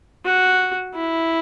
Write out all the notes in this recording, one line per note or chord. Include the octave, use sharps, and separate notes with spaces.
F#4
E4